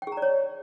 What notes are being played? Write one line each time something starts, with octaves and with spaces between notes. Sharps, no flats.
G5
G#4
A#5
D5
C#5